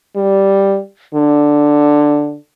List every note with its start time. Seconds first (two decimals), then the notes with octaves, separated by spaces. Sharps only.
0.16 G3
1.14 D3